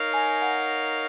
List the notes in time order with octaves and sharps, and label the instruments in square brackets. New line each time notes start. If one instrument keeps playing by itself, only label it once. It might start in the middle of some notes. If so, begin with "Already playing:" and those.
Already playing: [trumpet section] D#4 A#4 C#5 F5
[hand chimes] G#5
F#5